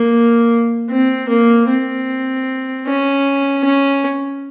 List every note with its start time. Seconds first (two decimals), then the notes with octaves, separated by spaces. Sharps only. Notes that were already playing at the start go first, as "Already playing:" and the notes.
Already playing: A#3
0.90 C4
1.29 A#3
1.69 C4
2.87 C#4
3.65 C#4